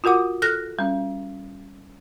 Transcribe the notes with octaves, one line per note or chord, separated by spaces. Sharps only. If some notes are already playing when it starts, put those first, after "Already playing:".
F4 F#4 A#4 F#5 D6
A4 F6 F#6 A#6
G3 C#4